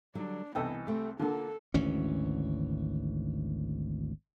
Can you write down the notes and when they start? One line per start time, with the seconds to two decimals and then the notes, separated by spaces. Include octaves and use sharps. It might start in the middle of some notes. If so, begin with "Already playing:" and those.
0.15 D3 F#3 G3 D4
0.55 C2 E3 B3 A4 D#5 G5
0.87 A3 C4 G4
1.19 D3 A#3 F4 A4
1.74 G#1 D2 E3 C#4